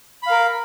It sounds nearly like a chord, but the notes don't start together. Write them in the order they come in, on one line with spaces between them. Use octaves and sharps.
B5 F5 A#4